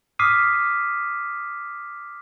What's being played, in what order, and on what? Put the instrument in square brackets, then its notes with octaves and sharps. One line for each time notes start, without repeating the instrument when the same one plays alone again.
[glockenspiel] D6 D#6 F6 B6 C7 D#7